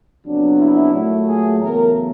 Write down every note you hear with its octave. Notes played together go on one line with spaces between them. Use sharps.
F2 C#3 F#3 B3 D4
E4
A#2 F#3 A3
G#4
E2 C#3 F#3 A3 A#4